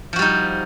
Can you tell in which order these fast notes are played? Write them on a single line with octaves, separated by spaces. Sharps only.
F3 F#4 G3 D#4